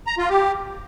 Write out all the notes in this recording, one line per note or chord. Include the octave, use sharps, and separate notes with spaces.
A#5
F4
G4